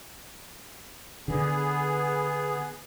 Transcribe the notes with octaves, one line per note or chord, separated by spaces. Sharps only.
D3 B3 G#4